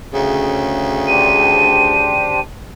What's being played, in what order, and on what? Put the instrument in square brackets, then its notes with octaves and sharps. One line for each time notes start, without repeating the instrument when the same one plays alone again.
[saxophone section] D2 C#3
[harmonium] D4 G4 C5 [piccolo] D#7